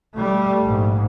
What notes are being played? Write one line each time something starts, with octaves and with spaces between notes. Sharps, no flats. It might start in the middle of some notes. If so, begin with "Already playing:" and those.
G3 A3
A#1 G#2